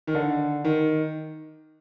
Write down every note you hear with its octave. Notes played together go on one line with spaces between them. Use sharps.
D#3
D3
D#3